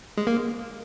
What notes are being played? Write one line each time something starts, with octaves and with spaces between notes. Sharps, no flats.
G#3
A#3